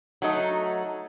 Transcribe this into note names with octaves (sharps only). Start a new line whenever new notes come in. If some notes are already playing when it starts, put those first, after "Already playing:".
F#3 A3 D#4